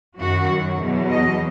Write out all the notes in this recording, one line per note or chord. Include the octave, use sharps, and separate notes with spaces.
F#2 D#3 F#3 F#4
E2 B2 F#3
D#5